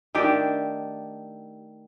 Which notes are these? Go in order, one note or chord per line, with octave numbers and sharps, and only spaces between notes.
D#3 A3 D4 G4